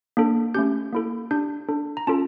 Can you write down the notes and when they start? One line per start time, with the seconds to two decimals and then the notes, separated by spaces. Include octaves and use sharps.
0.17 A#3 D4 A4
0.54 A3 C#4 G4 G6
0.93 A#3 E4 A4
1.31 D4 G4 G6
1.69 D4 A4
1.97 A#5
2.07 C#4 F4 A4 A5